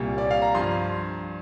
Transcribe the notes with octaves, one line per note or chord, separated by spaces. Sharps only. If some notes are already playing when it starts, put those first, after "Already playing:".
Already playing: C2 A#2 G3
D5
F5
A#5
G2 F3 C6